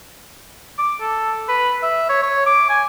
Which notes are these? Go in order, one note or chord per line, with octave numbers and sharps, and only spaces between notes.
D6
A4
B4
E5
C#5
C#5
D6
G#5